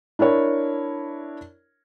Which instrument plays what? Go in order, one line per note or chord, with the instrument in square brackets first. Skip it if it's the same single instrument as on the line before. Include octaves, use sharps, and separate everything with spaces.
[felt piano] D4 E4 A#4 C#5